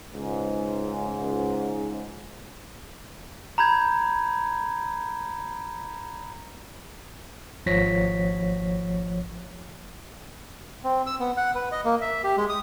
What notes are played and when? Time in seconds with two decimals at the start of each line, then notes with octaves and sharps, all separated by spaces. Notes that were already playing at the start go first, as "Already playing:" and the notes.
0.15 C#2 G#2
3.58 A#5 B5 G6 G#6
7.66 G#1 F3 C#5 A#6 B6
10.84 C4
11.07 E6
11.20 B3
11.37 F#5
11.55 B4
11.72 D#5
11.85 A#3
12.01 E5
12.24 G4
12.37 G#3
12.49 D#6